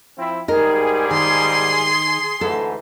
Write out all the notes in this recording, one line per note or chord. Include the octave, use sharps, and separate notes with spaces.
F3 C4 E4
G#2 G3 D#4 G#4 A#4
D#3 C6
D2 G#2 E3 A4